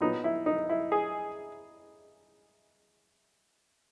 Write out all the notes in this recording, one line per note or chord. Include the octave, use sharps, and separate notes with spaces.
A#2 F#3 B3 D#4
E4
D#4
E4
G#4